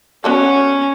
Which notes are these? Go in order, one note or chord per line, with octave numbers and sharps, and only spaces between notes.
B3 C#4 F#4 A4